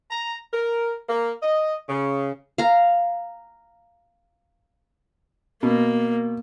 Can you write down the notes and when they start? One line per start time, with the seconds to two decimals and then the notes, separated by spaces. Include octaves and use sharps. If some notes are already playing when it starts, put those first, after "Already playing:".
0.11 A#5
0.53 A#4
1.09 A#3
1.43 D#5
1.89 C#3
2.58 F5 A#5
5.63 B2 A#3